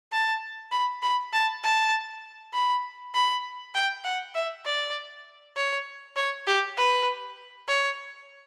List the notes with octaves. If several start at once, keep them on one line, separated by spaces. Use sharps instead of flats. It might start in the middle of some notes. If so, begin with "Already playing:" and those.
A5
B5
B5
A5
A5
B5
B5
G5
F#5
E5
D5
C#5
C#5
G4
B4
C#5